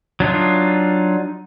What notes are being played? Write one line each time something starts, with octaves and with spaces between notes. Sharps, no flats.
F#3 D4 D#4 F4